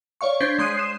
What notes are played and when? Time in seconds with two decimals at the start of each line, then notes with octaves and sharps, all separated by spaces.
0.21 C#5 D5 F5 C#6
0.40 D4 C5 G6 G#6 B6 C7
0.58 G#3 C6 D#6 F#6 C7 D#7
0.76 C7 D#7 E7